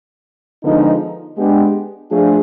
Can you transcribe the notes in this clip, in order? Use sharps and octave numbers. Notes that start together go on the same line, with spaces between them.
D3 F3 G#3 B3 D#4
G#3 B3 D4 G4
F3 A3 D4 F4 G#4